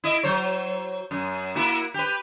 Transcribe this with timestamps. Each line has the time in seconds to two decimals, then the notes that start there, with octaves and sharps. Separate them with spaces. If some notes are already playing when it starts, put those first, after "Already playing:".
0.04 E4 D#5
0.23 F#3 C5 C#5
1.11 F#2
1.56 A#3 E4 F#4
1.94 G4 B4